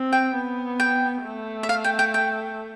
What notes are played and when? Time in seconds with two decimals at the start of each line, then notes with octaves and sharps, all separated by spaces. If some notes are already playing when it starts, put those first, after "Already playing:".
Already playing: C4
0.13 G5
0.35 B3
0.80 G5
1.25 A3
1.63 E5
1.69 F5
1.84 G5
1.99 G5
2.14 G5